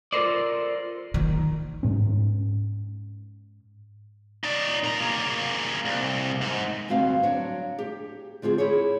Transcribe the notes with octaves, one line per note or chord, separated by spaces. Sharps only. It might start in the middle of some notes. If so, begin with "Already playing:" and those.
F4 A4 A#4 C5 D5
D#3
G#2 C#4
D#4 D5
A#2 A#5
A#3 G#4
C2
G#2
D2 G2 C4 F#4 F5
F#3 D4
G4
D3 C4 F4 G4 G#4
E4 G4 G#4 C#5